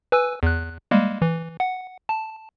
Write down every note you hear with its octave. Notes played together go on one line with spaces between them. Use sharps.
B4 G#5 E6
E2 F#6
G3 G#3 A#3
E3
F#5
A5